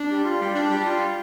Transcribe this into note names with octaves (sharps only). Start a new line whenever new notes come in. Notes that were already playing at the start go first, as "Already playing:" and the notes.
Already playing: D4
G3
F4
G3
D4
G3
F4